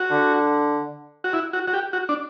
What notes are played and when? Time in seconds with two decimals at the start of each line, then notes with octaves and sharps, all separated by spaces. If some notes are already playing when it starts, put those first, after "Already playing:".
Already playing: F#4
0.11 D3
1.24 F#4
1.33 E4
1.53 F#4
1.68 F#4
1.73 G4
1.93 F#4
2.09 D4